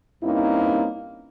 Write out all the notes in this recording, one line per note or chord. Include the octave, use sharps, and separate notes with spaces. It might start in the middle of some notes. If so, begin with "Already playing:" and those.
G2 A#3 C4 C#4 D#4 E4